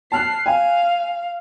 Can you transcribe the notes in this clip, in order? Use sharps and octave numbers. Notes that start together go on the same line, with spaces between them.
A5 F6 F#6 C7
F5 G#5